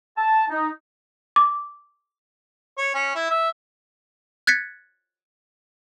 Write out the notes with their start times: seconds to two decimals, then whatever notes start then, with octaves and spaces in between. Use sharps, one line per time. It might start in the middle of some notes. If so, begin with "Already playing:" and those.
0.17 A5
0.49 D#4
1.36 D6
2.78 C#5
2.95 C#4
3.15 E4
3.31 E5
4.47 F#6 G#6 A6 B6 C#7